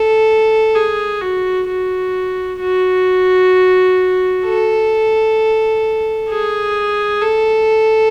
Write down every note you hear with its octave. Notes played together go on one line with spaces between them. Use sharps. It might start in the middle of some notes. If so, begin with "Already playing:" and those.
Already playing: A4
G#4
F#4
F#4
F#4
A4
G#4
A4